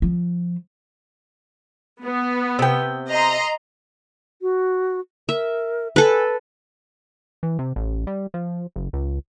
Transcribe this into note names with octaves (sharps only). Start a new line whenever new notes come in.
F3
B3
C3 G5
D#5 A#5 C6
F#4
A#4 E5
A4 B4 G#5
E3
C3
A1
G3
F3
F#1
C#2